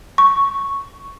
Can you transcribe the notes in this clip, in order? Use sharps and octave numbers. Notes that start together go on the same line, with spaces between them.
C#6